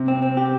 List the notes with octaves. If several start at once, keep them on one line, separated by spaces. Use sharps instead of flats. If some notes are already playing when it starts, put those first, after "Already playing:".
Already playing: C3
C4
C4
G4